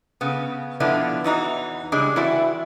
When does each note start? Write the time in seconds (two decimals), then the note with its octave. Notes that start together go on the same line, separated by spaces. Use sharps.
0.21 C#3 B3
0.80 B2 D3 F3 B3 D4 E4
1.24 E2 E3 D#4 F#4
1.92 C#3 G3 G#3 D4
2.16 E3 C4 E4 F#4 D5